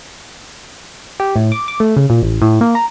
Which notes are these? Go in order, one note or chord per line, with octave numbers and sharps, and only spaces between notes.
G4
A2
D6
D6
A3
C#3
A#2
A1
A2
A#3
A#5